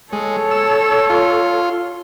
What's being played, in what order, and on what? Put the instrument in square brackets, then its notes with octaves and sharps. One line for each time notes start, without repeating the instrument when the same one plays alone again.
[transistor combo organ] G#3 [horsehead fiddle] A4 C#5
[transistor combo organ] E6
F4